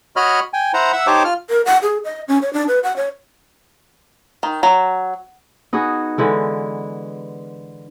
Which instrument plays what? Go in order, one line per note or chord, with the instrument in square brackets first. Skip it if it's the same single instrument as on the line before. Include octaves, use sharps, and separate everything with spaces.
[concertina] F#4 C#5 D#5 B5 F6
G5 G#5
E4 C5 F#5 A#5
E5 F#5 E6
D#4 G4 C5 C#5 A5 D6
F4 F6
[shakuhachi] A#4
F#5
G#4
D#5
C#4
C#5
D4
B4
F#5
C#5
[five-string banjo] D#3
F#3
[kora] B3 D#4 F#4 G#4
D3 E3 G#3